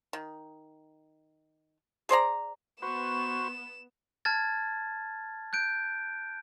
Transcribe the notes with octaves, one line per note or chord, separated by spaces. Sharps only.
D#3
G#4 C5 D5 A#5
B3 F#4 B4 C5 C#6 E7
A5 F6 G#6 A6
F#6 G6 D7